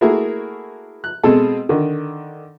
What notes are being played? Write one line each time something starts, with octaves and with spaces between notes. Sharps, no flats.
A3 A#3 E4 F#4 G#4 A#4
F#6
B2 G#3 C4 G#4 A4
D3 D#3